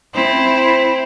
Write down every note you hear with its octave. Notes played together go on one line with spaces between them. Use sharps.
C4 E4